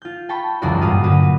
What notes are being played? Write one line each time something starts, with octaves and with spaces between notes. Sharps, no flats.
F4 G6
G5 A5 B5 C#6
E1 C#2 F#2 F4 F#4 D5
G2 A#2 F#4 F5 D#6
A#2 D3 A#3 F#4 B4 D#7